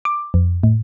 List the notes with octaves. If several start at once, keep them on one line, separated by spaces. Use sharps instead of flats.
D6
F2
A2